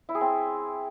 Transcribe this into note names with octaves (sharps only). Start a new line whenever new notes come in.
E4
G#4
C4